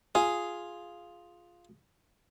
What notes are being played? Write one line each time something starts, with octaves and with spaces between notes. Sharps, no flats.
F4 G#4